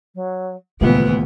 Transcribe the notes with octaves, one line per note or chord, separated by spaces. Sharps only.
F#3
D#1 C#2 A#2 E3 A3 B3 B4